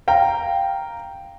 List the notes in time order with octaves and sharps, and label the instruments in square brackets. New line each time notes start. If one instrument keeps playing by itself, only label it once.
[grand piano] F5 G5 A#5